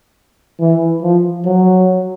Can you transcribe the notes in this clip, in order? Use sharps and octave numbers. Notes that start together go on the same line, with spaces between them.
E3
F3
F#3